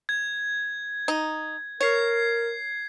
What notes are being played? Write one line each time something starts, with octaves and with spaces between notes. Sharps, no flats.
G#6
D#4
A#4 C#5 G#6 C7